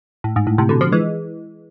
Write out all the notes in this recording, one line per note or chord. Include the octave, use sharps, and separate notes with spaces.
A2
G#2
A2
A2 C3
B2 D3
D3 F3
E3 G#3